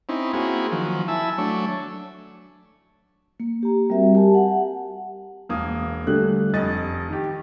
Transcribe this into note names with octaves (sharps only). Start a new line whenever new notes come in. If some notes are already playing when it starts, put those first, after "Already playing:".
C4 C#4 D#4 E4
A#3 C4 E4 F#4 G#4
D#3 F3 F#3
E4 E5 G#5 A5 E6
F#3 A3 D4 C#5
A#3
G4 A#5
G3 C4 F#4 A#4 E5
G4 G#5 A5
F#5
E1 A#3 D#6
D3 G3 A3 F#6
F1 D#5 A6
D#3 G4